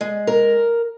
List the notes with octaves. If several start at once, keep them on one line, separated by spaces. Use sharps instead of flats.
G#3
A#4